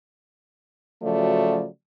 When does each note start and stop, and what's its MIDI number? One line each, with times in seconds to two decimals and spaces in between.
1.02 1.66 49
1.02 1.66 53
1.02 1.66 54
1.02 1.66 57
1.02 1.66 66
1.02 1.66 74